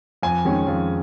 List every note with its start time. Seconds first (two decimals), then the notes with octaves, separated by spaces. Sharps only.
0.23 F2 G#5
0.45 D#3 G#3 C#4
0.67 F2